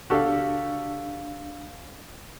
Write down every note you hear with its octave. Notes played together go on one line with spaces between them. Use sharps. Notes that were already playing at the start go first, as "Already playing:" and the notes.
C#2 D4 F#4 G4 A4 F5